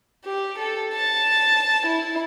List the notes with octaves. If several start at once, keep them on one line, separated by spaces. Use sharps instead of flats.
G4
A4
A5
E4